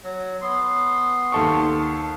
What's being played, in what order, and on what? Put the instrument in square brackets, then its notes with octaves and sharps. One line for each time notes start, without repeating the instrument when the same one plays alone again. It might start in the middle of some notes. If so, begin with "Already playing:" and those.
[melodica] F#3
B3 C6
[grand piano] D#2 A4 C#6